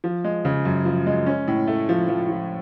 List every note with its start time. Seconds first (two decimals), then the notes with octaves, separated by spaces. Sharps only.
0.04 F3
0.24 G#3
0.45 C#3
0.65 F#2
0.85 F3
1.07 G#3
1.26 C#4
1.48 A2
1.67 A3
1.89 F3
2.09 F3
2.29 F3